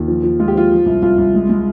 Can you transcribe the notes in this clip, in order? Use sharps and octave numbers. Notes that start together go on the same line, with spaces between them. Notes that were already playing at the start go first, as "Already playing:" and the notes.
Already playing: D#2 F4
F3
F3
G#3 F4
G4
F3 F4
F3
C2
C2 F4
C2
G#3
G#3